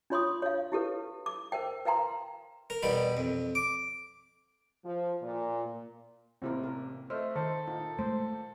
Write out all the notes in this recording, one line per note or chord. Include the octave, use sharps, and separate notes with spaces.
D4 F4 C#5 C6 C#6 D#6
C#5 F5
E4 G4 A4 B4
D6
A#4 C5 G5
B4 F5 G5 A#5 C6
A#4
E2 B2 G3 B5
F2
D6
F3
A#2
A1 C3 A#3 C4 E4 A#4
A#4
A3 C5 D#5 E6 F6
D#3 A4 C5
A#2 D#4
G#3 A3 C5